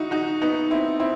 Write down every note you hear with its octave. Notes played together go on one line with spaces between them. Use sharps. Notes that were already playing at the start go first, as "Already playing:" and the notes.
Already playing: D#4 E4 F#4
D#4 F#4
B3 D#4
C4 E4
C4 E4